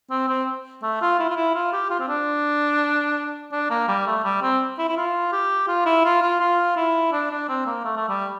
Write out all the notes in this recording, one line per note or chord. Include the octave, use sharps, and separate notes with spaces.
C4
C4
A3
F4
E4
F4
E4
F4
G4
F4
C4
D4
D4
A#3
G3
A3
G3
C4
E4
E4
F4
G4
F4
E4
F4
F4
F4
E4
D4
D4
C4
A#3
A3
A3
G3